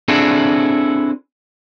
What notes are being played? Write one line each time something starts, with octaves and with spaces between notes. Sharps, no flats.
C4 D4 E4 F#4 G#4 A4